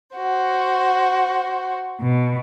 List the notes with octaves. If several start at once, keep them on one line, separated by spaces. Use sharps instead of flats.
F#4 C5
B2